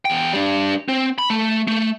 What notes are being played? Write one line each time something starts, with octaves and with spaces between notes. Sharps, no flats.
E2 G5
G3 D4
C4
B5
A3
A3